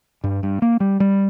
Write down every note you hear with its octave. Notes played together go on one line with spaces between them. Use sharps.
G2
G2
A#3
G3
G3